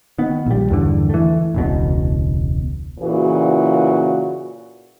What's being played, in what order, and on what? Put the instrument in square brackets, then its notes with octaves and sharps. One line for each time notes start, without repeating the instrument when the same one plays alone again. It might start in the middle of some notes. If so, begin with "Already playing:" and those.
[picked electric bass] D#3 B3
A#1 G3
E2 G2 D3
E3 A3
E1 C#2 B2
[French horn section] A#2 C#3 E3 F#4